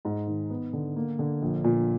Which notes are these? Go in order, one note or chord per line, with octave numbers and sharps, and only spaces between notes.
G#2
D#3
B3
D3
A#3
D3
A#1
A#2